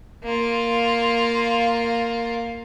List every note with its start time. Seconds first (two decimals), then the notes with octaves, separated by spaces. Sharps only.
0.24 A#3 F4